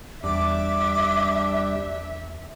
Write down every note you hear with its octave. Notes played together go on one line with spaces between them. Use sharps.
E2 G3 D4 E5 D6